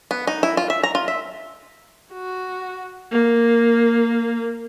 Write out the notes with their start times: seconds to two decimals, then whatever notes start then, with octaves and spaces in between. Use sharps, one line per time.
0.11 B3
0.27 D#4
0.43 E4
0.57 F4
0.70 E5
0.83 A#5
0.95 F4
1.08 E5
2.13 F#4
3.12 A#3